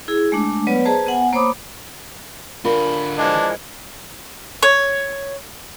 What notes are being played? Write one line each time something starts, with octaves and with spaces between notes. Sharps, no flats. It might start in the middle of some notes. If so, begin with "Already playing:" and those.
E4 G#4
G#3 A3 D4
F#3 B3 B4 C#5 D5
G#4 B4 C5 D#5 A5 A#5
B3 F#5 G#5
A#3 C5 C#5 B5 D6 D#6
D3 F4 A#4 D5 B5
E3 F3 G#3 D4
C#5